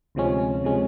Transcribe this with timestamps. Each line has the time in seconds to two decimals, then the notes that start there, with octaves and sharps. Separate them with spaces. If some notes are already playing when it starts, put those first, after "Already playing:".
0.15 D2 C3 F3 G#3 C#4
0.64 C3 F3 G#3 C#4